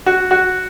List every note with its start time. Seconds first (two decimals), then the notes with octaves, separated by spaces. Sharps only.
0.06 F#4
0.31 F#4